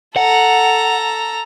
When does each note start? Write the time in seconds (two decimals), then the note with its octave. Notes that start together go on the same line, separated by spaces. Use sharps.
0.16 A4 F#5 A#5